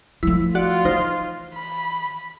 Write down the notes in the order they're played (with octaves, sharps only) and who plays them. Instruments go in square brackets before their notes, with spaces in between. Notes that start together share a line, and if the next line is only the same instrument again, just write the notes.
[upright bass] F3 A3 [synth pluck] E4
[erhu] F4 [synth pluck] F#4 D5 F#5
[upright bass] E3 [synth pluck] D#4 C5 F6
[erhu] B5